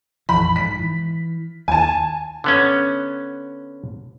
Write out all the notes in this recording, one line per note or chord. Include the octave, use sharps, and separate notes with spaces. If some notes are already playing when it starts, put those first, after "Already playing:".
A#1 F2 E3 B5
G#2 B6
E3
D#2 G#5 A5
D3 B3 C#4